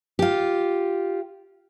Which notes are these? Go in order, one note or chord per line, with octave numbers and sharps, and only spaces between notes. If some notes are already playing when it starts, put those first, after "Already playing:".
F4 G4